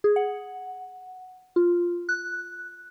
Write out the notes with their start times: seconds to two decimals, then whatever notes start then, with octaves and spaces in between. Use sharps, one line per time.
0.04 G#4
0.16 F#5
1.56 F4
2.09 F#6